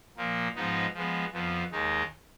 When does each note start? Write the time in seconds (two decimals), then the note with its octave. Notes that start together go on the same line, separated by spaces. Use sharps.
0.17 A#2 F3 A#3
0.55 G#2 F3 B3 D#4
0.94 F3 G#3 B3
1.33 F2 F3 B3
1.72 D#2 D#3 G#3 D#4